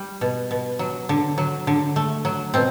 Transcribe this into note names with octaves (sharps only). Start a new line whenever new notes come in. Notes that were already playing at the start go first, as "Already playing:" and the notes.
Already playing: G3
B2
B2
F#3
D3
F#3
D3
A3
F#3
B2 C4